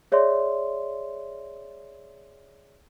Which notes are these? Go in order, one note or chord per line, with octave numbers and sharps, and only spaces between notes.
G#4 C#5 D5 E5 C6